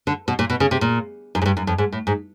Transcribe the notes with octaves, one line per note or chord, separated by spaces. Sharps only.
D3
B2
A#2
B2
C#3
C3
A#2
F#2
G#2
G2
F#2
F2
G#2
A2
G#2